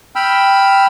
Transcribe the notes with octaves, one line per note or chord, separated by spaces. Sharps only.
G5 B5 E6 F6